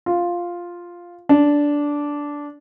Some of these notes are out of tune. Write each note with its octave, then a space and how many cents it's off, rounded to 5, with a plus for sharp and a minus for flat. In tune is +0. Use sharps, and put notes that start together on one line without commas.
F4 +0
D4 -10